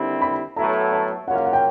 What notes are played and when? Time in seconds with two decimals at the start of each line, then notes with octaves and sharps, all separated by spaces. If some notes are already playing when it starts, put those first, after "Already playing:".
Already playing: D#2 D3 G3 C4 E4
0.22 B5
0.56 A2 F#3 B3 E4 A4 A#5
0.92 A5
1.27 C#3 F#3 A#3 C#4 F4 F#5
1.36 F5
1.45 F#5
1.53 G5